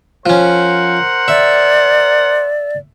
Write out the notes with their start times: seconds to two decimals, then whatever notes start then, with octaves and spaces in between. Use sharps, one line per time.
0.26 F3 C#4 A#4 C5 F#5
1.28 D5 E5